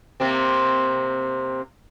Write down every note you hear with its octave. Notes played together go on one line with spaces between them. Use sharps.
C3 A#3 C4